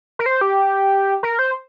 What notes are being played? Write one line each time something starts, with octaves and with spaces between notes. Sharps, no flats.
A#4
C5
G4
A#4
C5